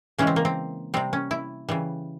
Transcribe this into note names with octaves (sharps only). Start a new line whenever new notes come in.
C#3 E3 G#3 C#4
C4
A#3
C4
C3 G3 C4
C#4
E4
C#3 E3 G3